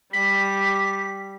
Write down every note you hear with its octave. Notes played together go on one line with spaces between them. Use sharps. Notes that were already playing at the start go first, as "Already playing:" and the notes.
G3 B6